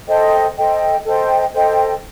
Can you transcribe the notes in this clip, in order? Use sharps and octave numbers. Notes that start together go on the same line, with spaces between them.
A4 C5 D#5 G5
A4 C5 D#5 G5
A4 C5 D#5 G5
A4 C5 D#5 G5